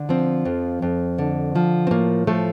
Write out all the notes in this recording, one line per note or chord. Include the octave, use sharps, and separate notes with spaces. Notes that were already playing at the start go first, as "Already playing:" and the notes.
Already playing: D3
F3 C4
F2
F2
D3
F3
C4
A2 A#3
F3 A3